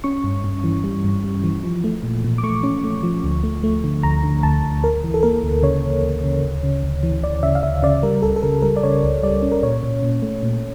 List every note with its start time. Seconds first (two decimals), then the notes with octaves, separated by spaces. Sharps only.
0.04 C#4 C#6
0.24 G2
0.44 G2
0.64 E3
0.84 G3
1.04 G2
1.24 G3
1.44 E3
1.64 F3
1.84 A3
2.03 A#2
2.24 A#2
2.38 D6
2.43 A3 C#6
2.63 C#4
2.84 A3
3.03 F3
3.24 D2
3.43 A3
3.64 A3
3.84 D3
4.03 D2 A#5
4.23 D3
4.43 D2 A5
4.64 D2
4.83 D2 A#4
5.04 E3
5.14 A4
5.23 A#3 A#4
5.43 D2
5.63 C#3 C#5
5.84 D2
6.03 D2
6.24 C#3
6.43 D2
6.63 C#3
6.83 D2
7.03 E3
7.23 D2 D5
7.43 C#3 E5
7.55 F5
7.63 D2 E5
7.83 C#3 D5
8.03 G3 A#4
8.22 C#2 A4
8.36 A4
8.43 C#3 A#4
8.62 G3 A#4
8.77 D5
8.83 C#3 C#5
9.04 C#2
9.23 G3 D5
9.42 C#4
9.52 A#4
9.63 A#2 C#5
9.83 A#2
10.03 A#2
10.22 A3
10.43 A#2